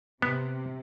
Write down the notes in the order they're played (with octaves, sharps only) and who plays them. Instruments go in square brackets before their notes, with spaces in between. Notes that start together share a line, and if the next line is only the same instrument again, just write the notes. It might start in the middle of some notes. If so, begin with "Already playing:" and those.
[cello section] C3 [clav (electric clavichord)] B3